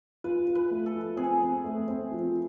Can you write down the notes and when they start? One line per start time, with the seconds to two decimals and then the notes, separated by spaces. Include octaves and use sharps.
0.24 F4 B4
0.47 F4
0.55 B4
0.71 A3
0.86 A4
0.94 F3
1.17 C4 G#4
1.41 C4
1.64 A3
1.88 C4
2.11 F3